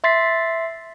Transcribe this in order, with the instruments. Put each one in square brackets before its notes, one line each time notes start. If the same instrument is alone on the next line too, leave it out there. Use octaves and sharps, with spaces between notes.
[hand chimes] E5 C6 A6 B6 C7